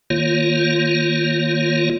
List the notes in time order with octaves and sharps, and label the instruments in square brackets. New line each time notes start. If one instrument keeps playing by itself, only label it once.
[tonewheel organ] D#3 A#3 F4 C#5